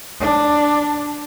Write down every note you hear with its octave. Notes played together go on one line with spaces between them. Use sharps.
D4